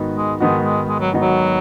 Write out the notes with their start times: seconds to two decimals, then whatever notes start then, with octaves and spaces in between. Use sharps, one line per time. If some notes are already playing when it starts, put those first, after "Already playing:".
Already playing: G#2 D#3 B3 D#4 F#4
0.17 G#3
0.40 G#2 D#3 G#3 B3 D#4 F#4
0.65 G#3
0.89 G#3
1.00 F#3
1.12 G#2 D#3 B3 D#4 F#4
1.22 F#3